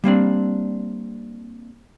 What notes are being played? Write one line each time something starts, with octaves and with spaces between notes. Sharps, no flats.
G3 A#3 C4 D4